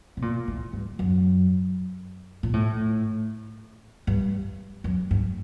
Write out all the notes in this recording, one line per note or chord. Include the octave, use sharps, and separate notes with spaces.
C3
A#2
A2
G2
F#2
A#2
A2
G2
F#2
G2